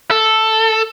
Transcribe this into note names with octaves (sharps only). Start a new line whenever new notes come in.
A4